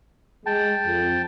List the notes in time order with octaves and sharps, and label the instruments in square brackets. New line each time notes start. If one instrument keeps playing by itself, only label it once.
[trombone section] G#3 [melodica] G5 A5
[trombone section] F2